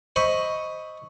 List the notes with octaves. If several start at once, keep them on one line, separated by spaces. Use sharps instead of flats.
C5 D#5 E5 B5 C#6